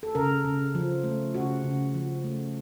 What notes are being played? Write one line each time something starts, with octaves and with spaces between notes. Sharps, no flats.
A4
C#3 A#4
C#3
F3
A3
C#3 F#4
C#3
F3
A3